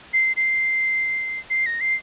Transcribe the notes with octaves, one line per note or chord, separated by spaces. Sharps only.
C7
C7
C7
A#6
C7